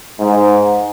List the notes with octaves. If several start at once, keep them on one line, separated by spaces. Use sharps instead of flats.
G#2